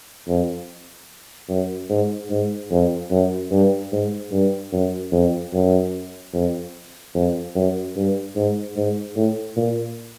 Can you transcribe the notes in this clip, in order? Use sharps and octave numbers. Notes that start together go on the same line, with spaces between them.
F2
F#2
G#2
G#2
F2
F#2
G2
G#2
G2
F#2
F2
F#2
F2
F2
F#2
G2
G#2
G#2
A2
A#2